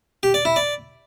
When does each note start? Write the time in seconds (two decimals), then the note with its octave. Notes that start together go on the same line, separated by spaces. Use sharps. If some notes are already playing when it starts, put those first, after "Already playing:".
0.23 G4
0.34 D5
0.45 E4
0.56 D5